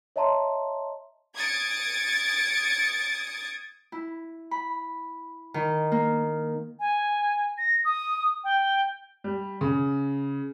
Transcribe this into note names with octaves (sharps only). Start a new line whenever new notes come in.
C#5 D#5 E5 A5 A#5 C6
D#6 G#6 A6 C#7 D7
E4
B5
D#3
A#3
G#5
A#6
D#6
G5
G3
C#3